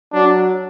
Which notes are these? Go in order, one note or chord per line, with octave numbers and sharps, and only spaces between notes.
F#3 D4